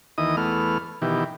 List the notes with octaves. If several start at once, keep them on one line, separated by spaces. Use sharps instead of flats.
D#2 E3 D#5 D#6
E2 A3 B3 F6
B2 D#3 E3 G4